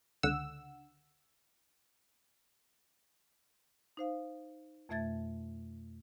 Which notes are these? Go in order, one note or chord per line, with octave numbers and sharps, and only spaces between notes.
C#2 D3 F#5 E6
D#4 C5 F5
F2 B2 A3 E5 G#6 A6